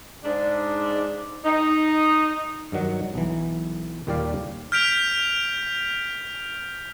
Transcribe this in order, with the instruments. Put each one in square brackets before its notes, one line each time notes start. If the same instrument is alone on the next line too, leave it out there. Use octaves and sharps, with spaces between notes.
[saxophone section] G#2 D4
D#4
[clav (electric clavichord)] G2 D#3 F#3 F#5
B1 E3
D#2 A#2 G3 G4 D5 F5
[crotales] F6 G6 B6 D7 F7